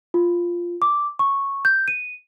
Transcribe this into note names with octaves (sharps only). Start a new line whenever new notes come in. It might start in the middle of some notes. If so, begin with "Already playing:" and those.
F4
D6
C#6
G6
D#7